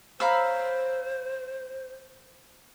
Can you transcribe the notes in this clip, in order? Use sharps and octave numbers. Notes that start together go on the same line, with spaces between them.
C5 C#5 F5 A#5 B5 E6